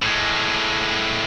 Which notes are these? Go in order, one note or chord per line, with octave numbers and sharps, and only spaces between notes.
A2 G#3